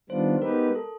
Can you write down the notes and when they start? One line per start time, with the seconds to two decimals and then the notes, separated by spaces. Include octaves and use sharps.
0.09 D#3 G3 B3 D4 F4 C5
0.42 G#3 B3 D#4 G4 A#4 B4
0.75 A4